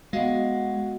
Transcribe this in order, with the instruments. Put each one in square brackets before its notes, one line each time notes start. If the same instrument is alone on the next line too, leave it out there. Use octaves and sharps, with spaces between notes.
[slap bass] G#3 [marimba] B3 D#5 F5 [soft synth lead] F#4